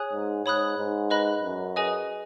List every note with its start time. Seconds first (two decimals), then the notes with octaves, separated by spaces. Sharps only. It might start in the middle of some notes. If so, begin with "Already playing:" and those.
Already playing: G#4 C#5 G#5 D#6 F#6
0.13 G#2
0.46 G#2 C#5 B5 D#6 F#6
0.77 G#2
1.10 B4 D#5 B5 F#6
1.43 F#2
1.76 G#4 B4 D#5 G#5 D#6